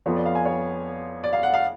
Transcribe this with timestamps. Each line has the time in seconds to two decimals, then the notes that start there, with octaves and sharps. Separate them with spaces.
0.06 F2 F3 B3 F4 C#5
0.16 D5
0.26 F5
0.35 G#5
0.45 C#5
1.24 D5
1.33 F5
1.43 F#5
1.54 F5